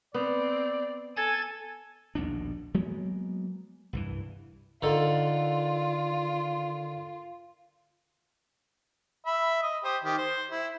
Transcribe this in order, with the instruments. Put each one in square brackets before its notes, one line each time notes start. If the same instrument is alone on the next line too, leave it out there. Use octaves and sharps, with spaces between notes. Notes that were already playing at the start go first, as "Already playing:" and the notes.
[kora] B3 [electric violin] C4 [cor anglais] D5
[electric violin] A4 [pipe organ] G#5 G#6 A6
[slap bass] A#1 D#2 B2 D4
F#3 G#3 A#3 B3
C2 G2 E3
[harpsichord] D3 D#3 A4 [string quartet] F4
[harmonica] E5 B5
D#5
G4 C5 D#6
D#3 G4
C5
E4